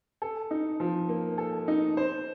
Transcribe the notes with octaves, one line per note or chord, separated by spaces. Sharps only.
A4
D#4
F3
A#3
A4
D#4
C5